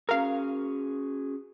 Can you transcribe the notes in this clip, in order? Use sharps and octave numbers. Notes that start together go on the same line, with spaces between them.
C#4 F#4 G#4 A#4 F5